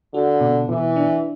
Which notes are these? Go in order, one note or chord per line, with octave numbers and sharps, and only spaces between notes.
D3 F#4
B2
B2 E3
D4